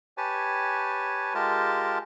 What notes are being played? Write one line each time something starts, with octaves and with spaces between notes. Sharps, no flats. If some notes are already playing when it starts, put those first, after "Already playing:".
G4 B4 C#5 G#5 A5
G#3 F4 G4 A#4 A5